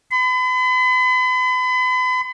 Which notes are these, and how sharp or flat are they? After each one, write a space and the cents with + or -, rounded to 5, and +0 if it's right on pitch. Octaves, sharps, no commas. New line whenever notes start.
B5 +40